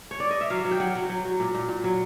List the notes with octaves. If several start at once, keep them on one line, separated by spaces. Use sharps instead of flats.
C#5
D5
D#5
E5
F#3 F5
F#3
G5
F#3 F#5
F#3
F#3
F#3
A#2
A#2
A#2
F#3